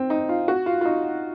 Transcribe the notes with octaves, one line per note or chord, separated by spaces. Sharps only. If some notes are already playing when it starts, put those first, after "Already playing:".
Already playing: C4
D#4
F4
F#4
F4
F4
D#4